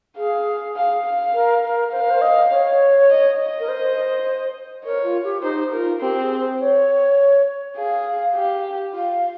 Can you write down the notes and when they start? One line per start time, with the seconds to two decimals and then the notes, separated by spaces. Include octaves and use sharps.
0.17 G#4 F5
0.76 F5
1.05 F5
1.34 A#4
1.64 A#4
1.92 C5 F5
2.01 A#4
2.10 C5
2.22 D#5
2.50 C#5
3.10 D#5
3.38 D#5
3.60 A#4
3.68 C5
4.84 A#4 C#5
5.04 F4
5.24 G4
5.43 D#4 C5
5.73 F4 A#4
6.01 C4 G4
6.21 G#4
6.40 C5
6.60 C#5
7.76 G#4 F5
8.35 G4
8.93 F4 F5